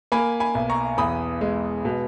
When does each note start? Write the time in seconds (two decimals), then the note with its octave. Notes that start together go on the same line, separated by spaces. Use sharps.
0.12 A#3 G#5 B5
0.40 G#5 B5
0.55 B1
0.69 A#5 C#6
0.98 E2 B5 D#6
1.41 G#3
1.85 B2